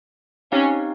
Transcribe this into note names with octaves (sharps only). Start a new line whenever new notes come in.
C4 C#4 D#4 G4 C#5 F5